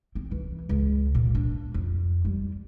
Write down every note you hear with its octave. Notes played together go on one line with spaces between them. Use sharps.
C4
E3
C#2
A#2
D4
F2
G3